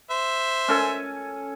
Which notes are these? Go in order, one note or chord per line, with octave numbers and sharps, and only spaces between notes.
C5 E5
C#4 A4 G#5